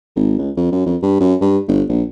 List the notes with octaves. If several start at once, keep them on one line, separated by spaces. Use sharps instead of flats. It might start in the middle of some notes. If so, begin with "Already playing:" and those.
G#1
C#2
F2
F#2
F2
G2
F#2
G2
G1
A#1